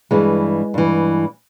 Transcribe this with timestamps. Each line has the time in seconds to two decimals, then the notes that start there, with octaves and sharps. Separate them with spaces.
0.11 G2 E3 G#3
0.74 G2 E3